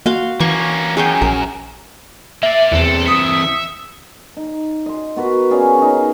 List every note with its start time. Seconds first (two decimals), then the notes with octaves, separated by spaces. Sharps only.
0.06 A#3 F#4 F5 C6
0.40 E3 A#3 C#4 C#6
0.97 F#2 G#4 C#5 G5
1.22 A#1 A#4
2.43 A#3 D5 E5
2.72 E2 E3 C4 A4
3.06 E5 D#6 C#7
4.37 D#4
4.86 D#5 C6
5.16 B3 F#4 A#4 B4
5.50 C#4 G#4 D5 F5
5.78 C#4 D#4